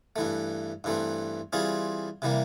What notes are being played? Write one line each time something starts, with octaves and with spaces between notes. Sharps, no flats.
G2 E3 A3
G2 E3 A3 C4
E3 G3 C4 F4 G#4
C3 E3 G3 A#3